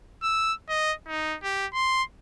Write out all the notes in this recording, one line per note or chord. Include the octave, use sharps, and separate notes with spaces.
E6
D#5
D#4
G4
C6